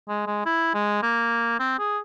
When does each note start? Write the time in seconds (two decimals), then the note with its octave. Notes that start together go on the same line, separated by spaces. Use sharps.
0.08 G#3
0.27 G#3
0.46 E4
0.74 G#3
1.03 A#3
1.59 C4
1.79 G#4